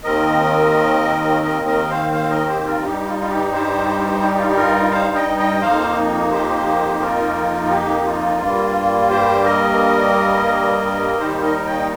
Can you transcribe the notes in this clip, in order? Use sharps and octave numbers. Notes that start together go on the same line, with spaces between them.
D#2 D#3 C4 A#4 D#5
A#4 D#5
A#4 D#5
C5 F5
C5 F5
A#4 D#5
G4 C5
F4 A#4
G2 G3 D#4 G4
F4
F4
G4
G4 C5
G4
F4
G4
F4 A#4
C5 F5
D#5 G5
D#5 G5
F2 F3 A#3 D#4 C5 F5
G4 C5
F4 A#4
A#4
G4
F4
G2 G3 A#3
G4 C5
A#4 D#5
D#2 D#3 G3 D#4 G4 C5
A#4 D#5
D#5 G5